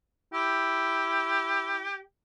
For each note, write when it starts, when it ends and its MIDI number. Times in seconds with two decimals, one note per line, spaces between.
0.33 1.87 64
0.33 2.00 67